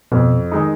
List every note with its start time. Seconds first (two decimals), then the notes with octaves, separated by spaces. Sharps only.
0.12 F2 B2
0.51 D#3 G#3 D#4